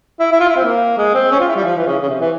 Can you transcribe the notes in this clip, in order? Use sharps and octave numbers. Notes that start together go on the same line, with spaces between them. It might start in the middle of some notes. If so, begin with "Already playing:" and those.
E4
E4
F4
E4
C4
A#3
G#3
C4
C#4
F4
E4
G3
F3
E3
C#3
C#3
C3
E3